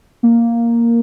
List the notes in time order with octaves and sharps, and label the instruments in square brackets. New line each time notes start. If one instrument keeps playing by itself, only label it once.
[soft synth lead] A#3